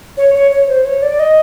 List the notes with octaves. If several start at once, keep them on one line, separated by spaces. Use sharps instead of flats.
C#5
C#5
C#5
C5
C#5
D5
D#5